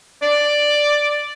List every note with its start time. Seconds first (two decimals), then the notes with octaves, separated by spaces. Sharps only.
0.22 D5